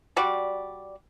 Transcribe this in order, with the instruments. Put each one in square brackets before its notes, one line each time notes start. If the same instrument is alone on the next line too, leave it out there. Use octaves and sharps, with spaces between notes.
[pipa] G3 F#4 D5